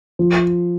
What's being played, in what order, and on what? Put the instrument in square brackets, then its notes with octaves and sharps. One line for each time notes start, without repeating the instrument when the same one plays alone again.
[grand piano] F3